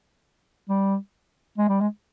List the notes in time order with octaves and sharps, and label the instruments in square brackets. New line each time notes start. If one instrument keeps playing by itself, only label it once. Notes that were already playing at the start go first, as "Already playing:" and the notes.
[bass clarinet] G3
G#3
G3
G#3